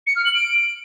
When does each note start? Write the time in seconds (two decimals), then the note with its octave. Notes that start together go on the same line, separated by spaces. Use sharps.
0.06 C#7
0.16 F6
0.25 F#7
0.34 D7